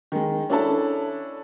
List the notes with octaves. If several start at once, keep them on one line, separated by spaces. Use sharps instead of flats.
D#3 G#3
C#4 D4 E4 A4 A5